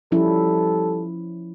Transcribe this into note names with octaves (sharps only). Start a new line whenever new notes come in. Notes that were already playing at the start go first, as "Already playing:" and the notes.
F3 G3 C#4 E4 A4